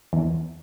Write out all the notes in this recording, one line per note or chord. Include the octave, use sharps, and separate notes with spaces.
E2